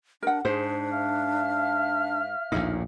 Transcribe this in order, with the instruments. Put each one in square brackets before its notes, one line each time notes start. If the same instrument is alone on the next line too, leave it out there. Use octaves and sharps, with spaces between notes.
[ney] D4 [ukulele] A#4 F#5
[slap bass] G#2 [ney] D4 [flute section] G#4 [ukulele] C5
[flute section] E5 F5 F6
[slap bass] A#1 D#2 A2 [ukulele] D#4